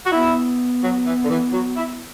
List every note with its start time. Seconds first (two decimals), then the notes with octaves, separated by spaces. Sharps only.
0.06 F#4
0.12 B3 E4
0.83 F#3
1.06 E3
1.24 D3
1.30 E3
1.53 F#3
1.77 E4